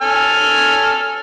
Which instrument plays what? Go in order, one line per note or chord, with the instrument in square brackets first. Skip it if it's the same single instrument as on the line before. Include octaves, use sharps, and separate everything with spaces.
[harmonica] A4 G#5 F6